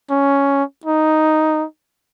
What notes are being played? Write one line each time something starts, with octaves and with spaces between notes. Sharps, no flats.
C#4
D#4